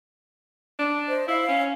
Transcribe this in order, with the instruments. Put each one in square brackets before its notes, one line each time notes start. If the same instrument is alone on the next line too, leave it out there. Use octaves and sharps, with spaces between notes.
[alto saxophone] D4
[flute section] C5 D#5
[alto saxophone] E4 [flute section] F5 B5
[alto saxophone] C#4